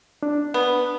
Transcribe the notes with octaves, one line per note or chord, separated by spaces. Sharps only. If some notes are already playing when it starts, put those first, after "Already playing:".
D4
B3